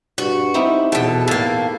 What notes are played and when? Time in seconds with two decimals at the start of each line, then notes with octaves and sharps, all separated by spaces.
0.18 G2 F#4
0.54 C4 D#4 E4 G4
0.92 E2 B2 A4 G5
1.28 A2 A#3 A4